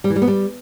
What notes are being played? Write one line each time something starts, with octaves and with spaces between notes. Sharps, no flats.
G3
E3
G3
B3
G3